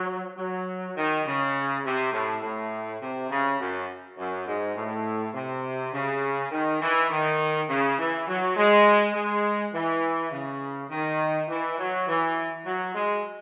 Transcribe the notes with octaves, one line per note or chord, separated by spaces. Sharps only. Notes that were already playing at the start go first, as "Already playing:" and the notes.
Already playing: F#3
F#3
D#3
C#3
C3
A2
A2
C3
C#3
F#2
F#2
G#2
A2
C3
C#3
D#3
E3
D#3
C#3
E3
F#3
G#3
G#3
E3
C#3
D#3
E3
F#3
E3
F#3
G#3